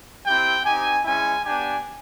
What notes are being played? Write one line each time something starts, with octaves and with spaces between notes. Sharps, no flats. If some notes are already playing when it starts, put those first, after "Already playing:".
C4 E4 G4 G5
C4 D#4 G4 G#5
G#3 C#4 E4 G#5
B3 D4 G4 G#5